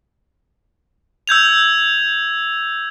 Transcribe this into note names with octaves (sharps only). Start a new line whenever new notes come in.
E6 G6 G#6 F7